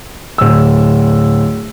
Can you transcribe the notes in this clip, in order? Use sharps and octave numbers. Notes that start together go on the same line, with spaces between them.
D1 E6